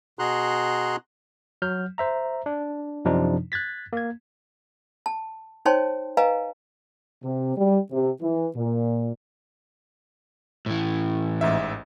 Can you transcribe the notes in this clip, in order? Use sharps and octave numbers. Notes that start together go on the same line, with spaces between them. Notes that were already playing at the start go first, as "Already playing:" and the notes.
B2 F#4 G#4 A#5 C6 F#6
F#3 F6 G6
C5 E5 A#5
D4
F#2 C3 F3 D4 D#4
F#6 G#6 A6 B6
A#3 G#6
A5
D#4 C5 C#5 G5 A5 C6
B4 D#5 F5 G#5 A#5
C3
G3
C3
E3
A#2
A2 E3
A1 G#2 E5